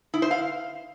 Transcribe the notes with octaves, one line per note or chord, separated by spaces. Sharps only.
E4
C5
F5